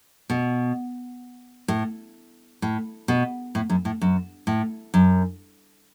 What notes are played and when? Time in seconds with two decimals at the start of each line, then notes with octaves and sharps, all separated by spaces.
0.30 B2
1.68 A2
2.62 A2
3.08 B2
3.55 A2
3.70 F#2
3.85 A2
4.02 F#2
4.47 A2
4.94 F#2